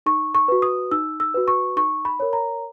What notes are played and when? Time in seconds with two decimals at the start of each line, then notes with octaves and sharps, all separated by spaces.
0.06 D#4 C#6
0.35 C#6
0.48 F#4 B4
0.62 D#6
0.91 D#4 E6
1.20 E6
1.34 F#4 B4
1.48 C#6
1.77 D#4 C#6
2.05 B5
2.20 A#4 C#5
2.33 A#5